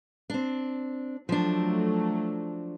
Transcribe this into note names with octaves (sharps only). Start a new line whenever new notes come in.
C4 D4
F3 F#3 A3 D4